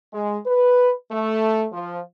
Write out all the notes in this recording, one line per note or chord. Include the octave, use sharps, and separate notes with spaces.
G#3
B4
A3
F3